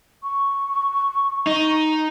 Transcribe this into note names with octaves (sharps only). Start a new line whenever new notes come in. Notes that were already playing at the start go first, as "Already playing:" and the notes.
C#6
D#4